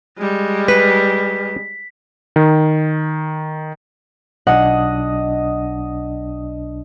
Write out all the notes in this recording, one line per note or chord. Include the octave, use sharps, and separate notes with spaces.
G3 G#3
B4 B6
D#3
B1 D4 D#5 F#5